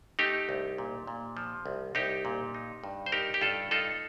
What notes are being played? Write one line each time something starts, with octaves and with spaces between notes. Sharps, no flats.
A3 D#4 G4
C2
A#2
A#2
F3
C2
C2 D#4 G4
A#2
D#4
G2
C5
D#4 G4 A#4
G4
G2 F4 A4
D#4 F4 A4